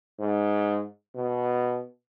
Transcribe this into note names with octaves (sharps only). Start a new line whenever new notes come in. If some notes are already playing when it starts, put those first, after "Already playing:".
G#2
B2